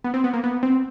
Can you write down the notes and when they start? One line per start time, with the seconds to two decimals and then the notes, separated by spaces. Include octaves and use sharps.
0.04 B3
0.14 C4
0.24 B3
0.34 A#3
0.44 B3
0.63 C4